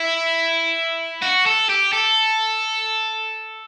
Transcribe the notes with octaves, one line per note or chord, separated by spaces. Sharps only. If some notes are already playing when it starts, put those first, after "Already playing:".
Already playing: E4
F#4
A4
G4
A4